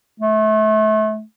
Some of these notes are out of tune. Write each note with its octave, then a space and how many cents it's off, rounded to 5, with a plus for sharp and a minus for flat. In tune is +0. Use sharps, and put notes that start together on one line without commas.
A3 -30